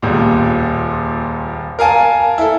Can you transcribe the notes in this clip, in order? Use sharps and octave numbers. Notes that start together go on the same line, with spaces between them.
D#1 C#2 A#2
A#4 F5 G#5 A5
E4 A4